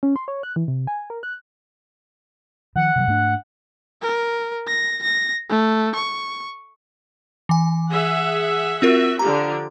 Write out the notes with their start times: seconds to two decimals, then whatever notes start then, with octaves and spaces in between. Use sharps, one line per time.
0.03 C#4
0.16 C6
0.28 C#5
0.43 F#6
0.56 E3
0.68 C3
0.87 G#5
1.10 A#4
1.23 F#6
2.76 D#3 F3 F#5
2.96 C3 D#3 F#3
3.07 G#2 A3 D4
4.02 A#4
4.67 A#6
5.03 A#6
5.50 A3
5.95 C#6
7.49 E3 G#5
7.91 G#4 E5 F#5
8.82 C4 F4 F#4 A#4 E5
9.19 D3 F3 G4 A#5